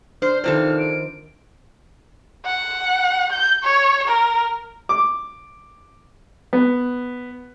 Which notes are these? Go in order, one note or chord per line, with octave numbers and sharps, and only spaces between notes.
D4 C5 F6
C3 D#3 E3 F4 A4 C5
D7
F#5
G6
C#5
A#4
D6
B3